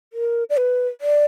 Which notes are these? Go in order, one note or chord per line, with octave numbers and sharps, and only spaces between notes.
A#4
D5
B4
D5